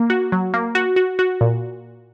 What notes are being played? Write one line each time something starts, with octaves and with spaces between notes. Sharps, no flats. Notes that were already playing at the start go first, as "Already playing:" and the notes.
Already playing: A#3
F#4
F#3
A#3
F#4
F#4
F#4
A#2